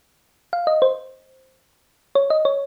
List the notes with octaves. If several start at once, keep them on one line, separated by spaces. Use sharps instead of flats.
F5
D#5
C5
C#5
D#5
C#5